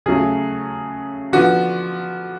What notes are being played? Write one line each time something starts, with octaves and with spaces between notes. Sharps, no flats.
C#3 F#3 A3 G#4
D3 F3 B3 F#4